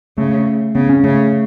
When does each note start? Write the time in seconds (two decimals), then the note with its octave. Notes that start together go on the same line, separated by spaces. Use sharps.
0.18 C#3 A3
0.75 C#3 B3
0.89 C#4
1.04 C#3 A3